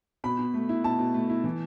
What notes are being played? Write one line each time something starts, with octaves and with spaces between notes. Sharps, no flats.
B2 B5
B2
A3
E4
B2 A5
B2
A3
E4
E3